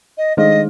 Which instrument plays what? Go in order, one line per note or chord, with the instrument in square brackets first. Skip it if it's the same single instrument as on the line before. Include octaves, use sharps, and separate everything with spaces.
[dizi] D#5
[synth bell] D#3 G#3 D#4 G#4 [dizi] D#5